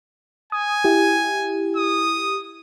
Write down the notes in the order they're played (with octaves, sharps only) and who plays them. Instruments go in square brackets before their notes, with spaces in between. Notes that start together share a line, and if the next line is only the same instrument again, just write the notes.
[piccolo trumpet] G#5 [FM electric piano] D#6
[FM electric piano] E4 G4
[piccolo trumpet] D#6